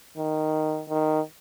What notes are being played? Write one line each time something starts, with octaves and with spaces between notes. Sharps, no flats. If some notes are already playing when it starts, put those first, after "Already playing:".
D#3
D#3